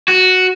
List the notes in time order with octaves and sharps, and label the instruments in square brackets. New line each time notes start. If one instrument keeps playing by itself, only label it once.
[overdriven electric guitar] F#4